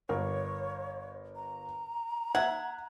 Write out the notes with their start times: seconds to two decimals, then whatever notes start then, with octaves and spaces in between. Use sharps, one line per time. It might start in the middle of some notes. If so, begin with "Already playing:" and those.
0.09 G1 A#4 C#5
1.36 A#5
2.35 E5 F#5 G#6